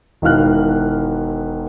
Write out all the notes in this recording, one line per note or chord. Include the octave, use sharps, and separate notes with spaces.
E1 D#3 E4 F5 F6 F#6